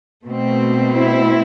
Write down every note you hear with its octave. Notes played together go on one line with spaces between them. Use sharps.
B2 A3 C4
E4